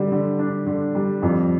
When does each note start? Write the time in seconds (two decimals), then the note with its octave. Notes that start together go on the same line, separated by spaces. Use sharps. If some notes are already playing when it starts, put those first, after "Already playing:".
Already playing: D3 G3
0.11 D3
0.39 D4
0.66 D3
0.95 G3
1.22 F2